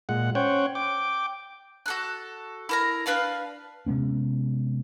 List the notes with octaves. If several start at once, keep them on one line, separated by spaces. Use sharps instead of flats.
A#2 G#3 F#5
C#4 C5 C#5 F#5 G5
G5 D6
F#4 A4 F#6
E4 A#4 A#5
D4 B4 F5 A5
C3 G#3 B3 C#4